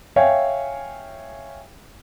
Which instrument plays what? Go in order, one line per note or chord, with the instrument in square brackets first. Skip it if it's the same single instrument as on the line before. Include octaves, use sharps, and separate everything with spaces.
[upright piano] C#5 E5 F5 G5 G#5